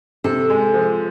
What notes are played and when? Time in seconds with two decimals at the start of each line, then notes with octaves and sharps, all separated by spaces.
0.24 C3 A4
0.50 G#3
0.74 F3